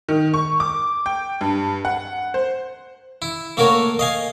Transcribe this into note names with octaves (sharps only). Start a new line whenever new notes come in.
D#3
C#6
D6
G5
G2
F#5
C5
E4
A3 A#3 F#4 A#4 C#5
D#5 F5 G#5